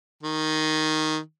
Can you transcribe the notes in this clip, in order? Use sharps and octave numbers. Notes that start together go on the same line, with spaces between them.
D#3